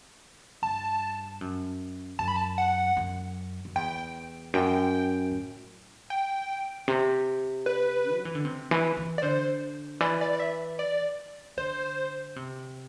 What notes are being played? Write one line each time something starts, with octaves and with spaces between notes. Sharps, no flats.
G2 A5
F#2
F#2 A5
B5
A5
F#5
F#2
F#2
E2 G5
F#2 G5
A2
G5
C3
B4
F#3
E3
D3
C3
E3
E3
D5
D3 C5
E3 D5
D5
D5
E5
D5
D3 C5
C3